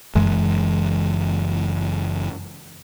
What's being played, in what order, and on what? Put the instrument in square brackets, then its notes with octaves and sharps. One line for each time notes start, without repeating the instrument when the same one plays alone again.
[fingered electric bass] F#1 F#2 E3 G#3